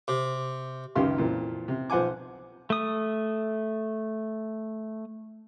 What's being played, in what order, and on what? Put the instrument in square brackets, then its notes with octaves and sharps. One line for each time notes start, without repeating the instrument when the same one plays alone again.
[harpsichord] C3
[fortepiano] C#2 F#2 D#3 G4 F5 C6
F2 A#2 E3 F3
C3
B1 F3 C5 F#5 G#5 D6
[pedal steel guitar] A3 D#6